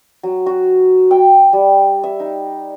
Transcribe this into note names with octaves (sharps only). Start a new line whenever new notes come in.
F#3
F#4
G5
G3
E5
D#4